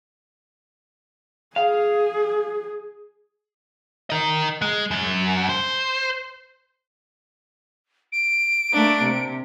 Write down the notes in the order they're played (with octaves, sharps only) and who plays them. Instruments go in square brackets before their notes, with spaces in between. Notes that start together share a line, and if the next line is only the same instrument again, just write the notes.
[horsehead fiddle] G#4 [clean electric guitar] F5
[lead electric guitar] A#4 D#5
G#3
F#2
C5
[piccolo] D7
[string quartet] A3 A#3 D4
C3